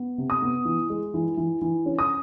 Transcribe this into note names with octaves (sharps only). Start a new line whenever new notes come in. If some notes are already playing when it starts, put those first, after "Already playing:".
Already playing: B3
C3
D#6
B3
E3
G#3
E3
E3
E3
C#4
D#6